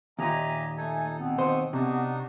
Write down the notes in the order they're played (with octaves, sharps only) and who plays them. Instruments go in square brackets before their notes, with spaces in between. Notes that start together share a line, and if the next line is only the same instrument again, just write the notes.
[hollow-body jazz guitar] D#2 A#2 [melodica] G4 D#5 [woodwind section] E5 G#5 A#5
[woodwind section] A3 G#5 [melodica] D#4 A4
[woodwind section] B2 B3 C4
[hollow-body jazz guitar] D#2 C5 [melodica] C#6 D#6
[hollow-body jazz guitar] C3 [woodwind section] B3 [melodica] D4 D#4 F#4